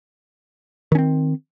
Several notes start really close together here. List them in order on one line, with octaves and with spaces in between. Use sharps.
D#3 C#4 C4